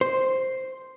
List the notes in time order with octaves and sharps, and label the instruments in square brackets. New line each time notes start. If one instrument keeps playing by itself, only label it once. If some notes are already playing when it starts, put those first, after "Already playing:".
[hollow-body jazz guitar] C5